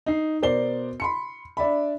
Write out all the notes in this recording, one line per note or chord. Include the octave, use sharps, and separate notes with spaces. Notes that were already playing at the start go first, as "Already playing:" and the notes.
D#4 C7
B2 A#4 C5 D5 C7 G7
B5 C6 C#7
D4 D5 E5 B5